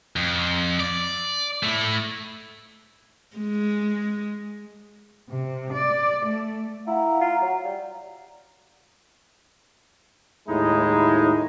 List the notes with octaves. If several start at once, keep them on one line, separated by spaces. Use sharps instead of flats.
F2
D5
A3 E4
G#3
C3
D5
A3
E4 F5 F#5 A#5
F4
F#3
G3
D#2 A2 G#3 D#4 E4